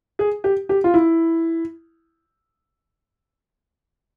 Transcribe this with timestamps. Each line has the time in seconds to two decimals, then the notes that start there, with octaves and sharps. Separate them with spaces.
0.19 G#4
0.44 G4
0.69 G4
0.84 F4
0.94 E4